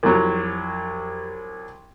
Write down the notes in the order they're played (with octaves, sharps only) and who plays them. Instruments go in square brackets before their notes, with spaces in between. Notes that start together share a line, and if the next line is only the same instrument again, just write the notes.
[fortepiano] C2 F#3 [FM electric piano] F2 F3 G4